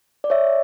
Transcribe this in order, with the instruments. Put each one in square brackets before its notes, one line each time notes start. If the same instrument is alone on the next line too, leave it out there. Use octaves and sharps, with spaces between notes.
[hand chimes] D5
C#5 E5